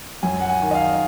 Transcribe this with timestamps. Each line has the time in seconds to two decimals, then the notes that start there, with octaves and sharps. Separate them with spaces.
0.23 F#2 G#5
0.40 F#5
0.50 G#5
0.62 D#3
0.71 D#5
0.75 F5